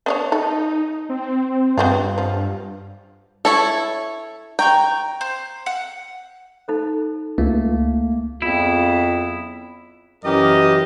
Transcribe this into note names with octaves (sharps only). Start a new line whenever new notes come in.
B3 D4 C#5
D#4 A4
C4
G2 B3 C4 F4
F3
E4 A4 C#5 C#6
G5 A#5 C#6 G6
C5
F#5
D#4 A4 C5
C#2 A3 A#3
F2 C#3 F#3 B3 E4 F4
F#2 E3 F#3 G4 A#4 D#5